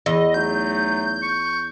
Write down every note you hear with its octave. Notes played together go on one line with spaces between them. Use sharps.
E2 D#5
F#3 A3 D#4 G6
C#6